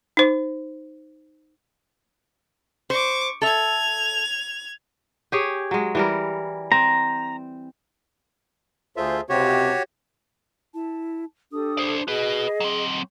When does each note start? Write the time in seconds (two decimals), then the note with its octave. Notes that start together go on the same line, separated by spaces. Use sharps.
0.17 D#4 C5
2.90 C5 C#6 D6
3.42 A4 E5 G#6 F7
5.32 G4 G#4 C#5
5.71 F#3 G#3
5.95 E3 G3 A#4
6.72 C4 A#5
8.97 D2 F4 G#4 A4 C5 E5
9.29 C#2 C3 F#4 G4 C#5
10.74 E4 A5
11.52 D4 G4 A4 D#6
11.77 C5 D5
12.08 F#4 G#4 B4 D#5
12.60 F#3 C4